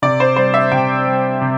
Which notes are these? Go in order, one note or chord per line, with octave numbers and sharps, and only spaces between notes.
C3 D5
C5
G3 C5
E5
C3 G5
G3
C3